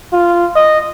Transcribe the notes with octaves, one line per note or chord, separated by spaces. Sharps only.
F4
D#5